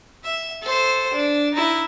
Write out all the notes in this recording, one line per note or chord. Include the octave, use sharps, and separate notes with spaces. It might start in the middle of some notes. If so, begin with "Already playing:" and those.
E5
A4 C5
D4
D#4 E4